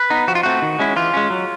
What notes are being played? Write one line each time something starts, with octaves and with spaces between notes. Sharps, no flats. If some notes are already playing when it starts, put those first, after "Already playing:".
Already playing: B4
B3 D#4
F3 F#4
F4
A3 C4 F#4
D#3
G#3 C#4 E4
E3 F4
G#3 C#4
F#3